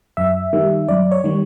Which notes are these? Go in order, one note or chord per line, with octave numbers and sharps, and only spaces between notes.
F#2 E5
D#3 G3
F#2 D5
C#5
D#3 G3